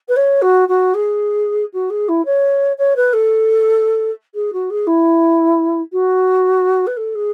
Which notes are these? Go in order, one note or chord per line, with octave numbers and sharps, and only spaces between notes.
B4
C#5
F#4
F#4
G#4
F#4
G#4
E4
C#5
C#5
B4
A4
G#4
F#4
G#4
E4
F#4
B4
A4
G#4